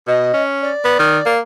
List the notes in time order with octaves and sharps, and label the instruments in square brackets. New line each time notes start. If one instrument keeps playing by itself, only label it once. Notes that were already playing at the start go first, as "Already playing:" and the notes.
[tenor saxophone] B2 [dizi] D#5
[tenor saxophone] C#4
[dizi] D5
[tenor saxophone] B3
D#3
A#3